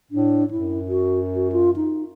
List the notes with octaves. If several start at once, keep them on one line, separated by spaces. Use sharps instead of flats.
A2 D4
F#2 E4
F#4
F#4
F4
D#4